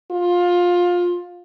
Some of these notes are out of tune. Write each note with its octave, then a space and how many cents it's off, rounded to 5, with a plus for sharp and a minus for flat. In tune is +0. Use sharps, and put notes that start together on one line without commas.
F4 +20